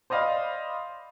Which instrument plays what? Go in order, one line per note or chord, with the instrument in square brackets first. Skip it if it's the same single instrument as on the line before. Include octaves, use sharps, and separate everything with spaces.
[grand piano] C5 D5 D#5 F5 B5